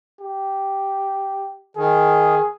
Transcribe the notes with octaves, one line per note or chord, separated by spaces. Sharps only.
G4
D#3 G#4